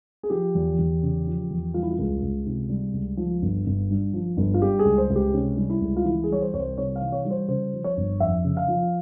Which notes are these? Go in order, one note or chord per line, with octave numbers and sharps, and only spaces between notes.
G#4
F3 G4
E2
E2
C#3
F3
E2
G3 F4
E4
F4
C#2
C#2
C3
G3
C#2
F3
G1
G1
G2
F3
G1
F4
G3 G4
G#4
C#2
C5
C#2
G4
C3 C#4
G3
E4
C#2
F4
E3 E4
G#4
G3 C#5
C5
C2 C#5
C5
C3 C#5
F5
E3
C#5
G3
C5
C#3 C5
F3
C#5
G1
F2 E5
C#3
F5
F3